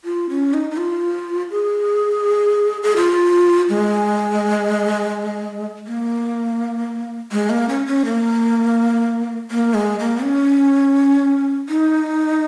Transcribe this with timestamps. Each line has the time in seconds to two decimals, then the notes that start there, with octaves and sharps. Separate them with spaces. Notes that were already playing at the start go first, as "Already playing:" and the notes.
0.05 F4
0.30 C#4
0.54 D#4
0.71 D#4
0.77 F4
1.51 G#4
2.83 G#4
2.96 F4
3.69 G#3
5.87 A#3
7.32 G#3
7.50 A#3
7.69 C#4
7.87 C#4
8.05 A#3
9.51 A#3
9.74 G#3
9.99 A#3
10.23 C#4
11.69 D#4